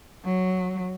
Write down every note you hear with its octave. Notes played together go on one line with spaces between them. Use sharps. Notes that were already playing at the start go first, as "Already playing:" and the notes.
F#3